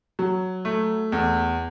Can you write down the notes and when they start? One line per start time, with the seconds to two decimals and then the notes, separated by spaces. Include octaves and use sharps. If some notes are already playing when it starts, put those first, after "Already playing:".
0.19 F#3
0.65 A3
1.12 E2